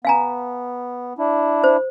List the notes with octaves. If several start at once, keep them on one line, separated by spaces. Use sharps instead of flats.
B3 F5 G#5 A#5
D4 E4
C5